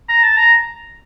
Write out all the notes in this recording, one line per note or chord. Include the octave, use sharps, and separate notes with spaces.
A#5
A5
A#5